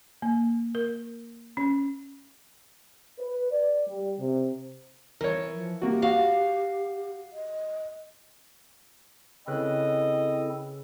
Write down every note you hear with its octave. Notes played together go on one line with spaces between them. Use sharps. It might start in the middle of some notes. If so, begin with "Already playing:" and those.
A#3
A#4
C#4
B4
D5
G3
C3
E3 A#4 C#5
F3
A#3 F#4 G4
F#4 F5
D#5
C#3 C4 E4 A4 B4 D#5 F#6